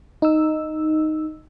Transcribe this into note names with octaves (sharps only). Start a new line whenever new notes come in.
D#4 E6